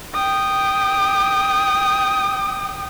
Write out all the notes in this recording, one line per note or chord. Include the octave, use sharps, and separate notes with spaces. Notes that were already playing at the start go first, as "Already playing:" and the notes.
G5 D#6